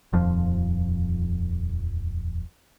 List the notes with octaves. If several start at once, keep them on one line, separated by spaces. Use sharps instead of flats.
D#1 F2 F3